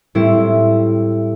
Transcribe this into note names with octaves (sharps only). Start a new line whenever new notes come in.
A2 G3 C4 E4